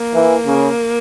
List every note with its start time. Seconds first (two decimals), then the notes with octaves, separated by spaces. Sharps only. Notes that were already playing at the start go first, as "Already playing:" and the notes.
Already playing: A#3
0.14 E3
0.46 C#3